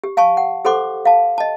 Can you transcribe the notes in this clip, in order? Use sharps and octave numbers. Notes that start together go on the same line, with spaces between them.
G4
F5 G#5 A5 C#6
F#5
G4 A4 C5 F#5 C6 D6
F5 A5
D#5 A5